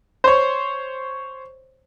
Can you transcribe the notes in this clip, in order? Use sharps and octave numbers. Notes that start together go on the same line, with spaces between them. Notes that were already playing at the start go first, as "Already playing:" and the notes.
C5 C#5